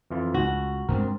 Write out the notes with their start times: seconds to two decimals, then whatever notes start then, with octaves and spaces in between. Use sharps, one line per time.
0.10 F2 E3 F4
0.34 C#2 F#4
0.89 G2 G#3 C4 D4 A#4